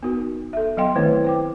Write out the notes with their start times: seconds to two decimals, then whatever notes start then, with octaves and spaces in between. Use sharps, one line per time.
0.03 B3 D#4 F#4 A#4
0.53 A4 E5
0.77 F#3 B3 D#5 F5 G5 C6
0.96 D#3 A3 C4 E4 B4 C#5
1.24 C5 G5 D6